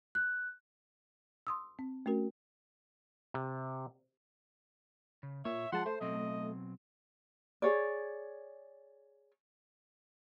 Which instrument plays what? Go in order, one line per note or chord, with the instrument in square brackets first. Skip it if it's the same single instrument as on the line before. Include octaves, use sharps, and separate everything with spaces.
[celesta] F#6
[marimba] C6 D#6 E6
C4
A3 C#4 F#4 A#4
[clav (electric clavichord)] C3
[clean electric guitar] C#3
[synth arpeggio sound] A#2 [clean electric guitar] C#5 [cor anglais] E5
[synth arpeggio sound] F3 G#3 A5 [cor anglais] F#5 [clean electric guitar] C6
[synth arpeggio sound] A3 [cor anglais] C5
[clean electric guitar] B2 F#3 C4 [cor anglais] D#5
[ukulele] G#4 C#5 D5